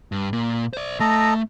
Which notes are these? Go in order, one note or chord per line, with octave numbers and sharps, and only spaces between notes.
G2
A#2
C5 D5
A3 A4 D#5 A#5